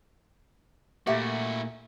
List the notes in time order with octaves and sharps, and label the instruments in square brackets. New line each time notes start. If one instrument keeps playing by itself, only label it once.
[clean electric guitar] A#2 A3 A#3 [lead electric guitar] E4 F#4 [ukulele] G4 E5 F#5